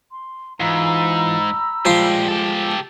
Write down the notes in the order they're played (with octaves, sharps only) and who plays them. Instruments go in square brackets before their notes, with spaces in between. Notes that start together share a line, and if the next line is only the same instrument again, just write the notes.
[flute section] C6
[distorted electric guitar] G#2 [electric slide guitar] E3 F4 [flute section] A#5 B5 E6
[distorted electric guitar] A#2 G4 [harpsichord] F3 C6 [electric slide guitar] G#3
[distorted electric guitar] G4 A4